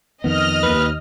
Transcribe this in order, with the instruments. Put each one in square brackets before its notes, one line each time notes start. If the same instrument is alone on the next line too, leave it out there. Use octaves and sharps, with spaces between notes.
[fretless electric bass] F2 D#3 B3 [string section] D#5 F6
[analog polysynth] D#2 [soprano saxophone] B4